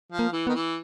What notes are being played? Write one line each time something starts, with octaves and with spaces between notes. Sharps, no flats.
F3
A#3
E3
D#3 B3
E3